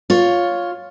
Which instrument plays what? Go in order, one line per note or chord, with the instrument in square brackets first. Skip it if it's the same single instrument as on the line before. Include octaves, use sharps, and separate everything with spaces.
[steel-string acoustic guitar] F4 C#5